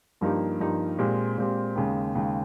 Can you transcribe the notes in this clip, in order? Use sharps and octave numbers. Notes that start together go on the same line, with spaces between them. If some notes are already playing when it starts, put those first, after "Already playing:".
G2 F3 A#3 D#4 G4
G2 F3 A#3 D#4 G4
A#2 G#3 C4 G4
A#2 G#3 C4 G4
D#2 C#3 G#3
D#2 C#3 G#3